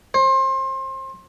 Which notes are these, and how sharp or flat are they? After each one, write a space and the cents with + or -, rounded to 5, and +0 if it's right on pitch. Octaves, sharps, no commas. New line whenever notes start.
C5 +30